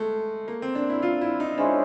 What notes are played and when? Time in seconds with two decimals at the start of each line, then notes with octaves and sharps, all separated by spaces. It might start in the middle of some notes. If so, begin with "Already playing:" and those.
Already playing: G#3 A3
0.48 A#3
0.62 C4
0.75 D4
0.90 E4
1.02 F4
1.21 E4
1.40 D#4
1.58 G#3 C#4 D4 E4 G#4 C5